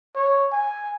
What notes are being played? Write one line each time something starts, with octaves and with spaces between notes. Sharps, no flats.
C#5
G#5